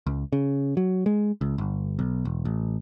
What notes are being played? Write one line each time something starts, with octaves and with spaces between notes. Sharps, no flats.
C#2
C#3
F#3
G#3
C#2
G1
B1
E1
A1